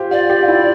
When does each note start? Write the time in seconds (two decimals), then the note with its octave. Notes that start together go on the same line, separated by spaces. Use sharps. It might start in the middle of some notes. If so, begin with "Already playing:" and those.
Already playing: F4 G4 C5
0.11 F4 D5
0.30 G4
0.43 F4
0.48 E4